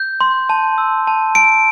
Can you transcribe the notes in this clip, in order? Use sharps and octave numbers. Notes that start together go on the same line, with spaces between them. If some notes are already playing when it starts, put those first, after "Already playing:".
Already playing: G6
C6
A5
E6
A5
A5 D7